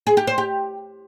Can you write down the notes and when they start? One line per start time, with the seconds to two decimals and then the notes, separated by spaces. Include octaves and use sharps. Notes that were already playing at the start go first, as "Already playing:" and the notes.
0.07 G#4
0.17 G4
0.27 C5
0.38 G4